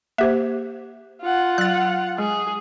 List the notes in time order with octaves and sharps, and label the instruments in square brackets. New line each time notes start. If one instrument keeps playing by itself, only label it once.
[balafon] A#3 C5 [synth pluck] G4 E5
[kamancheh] F4 F#5
[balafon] F#3 [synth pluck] F#6 A6
[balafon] G#3 [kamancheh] G#4